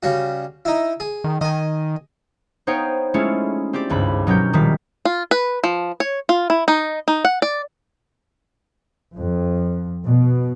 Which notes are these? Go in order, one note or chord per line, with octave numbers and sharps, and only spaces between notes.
C#3 G3 F#4
D#4 E4
G#4
D#3
D#3 D#5 G#5
B3 D#4 C5 C#5 F5 G5
G#3 A3 C#4 E4 F4
C4 G4 C5 D5
G#1 C#2 G2 B5
B2 F#3 C#4 G4 A#4 G6
D#1 D#3 G3 F4 B6
F4
B4
F3
C#5
F4
E4
D#4
D#4
F#5
D5
F2
B2